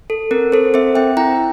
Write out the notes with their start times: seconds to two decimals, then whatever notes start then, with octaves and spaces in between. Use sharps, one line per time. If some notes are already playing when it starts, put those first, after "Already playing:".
0.10 A4
0.31 C4 A#4
0.52 C4 A4 C5
0.74 C4 C5 E5
0.95 C4 E5 G5
1.17 E4 G5 A#5